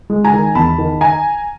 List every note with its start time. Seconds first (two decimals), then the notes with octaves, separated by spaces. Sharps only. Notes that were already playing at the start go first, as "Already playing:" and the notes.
0.10 G#3
0.25 G#5 A#5
0.33 D#3
0.55 E2 A5 B5
0.78 D#3
1.01 G#5 A#5